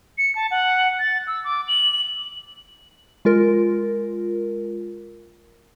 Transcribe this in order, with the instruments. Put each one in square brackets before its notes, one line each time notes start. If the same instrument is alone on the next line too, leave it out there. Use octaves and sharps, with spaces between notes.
[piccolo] C#7
A5
F#5
A6
E6
D6
F#7
[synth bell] G#3 F4 A#4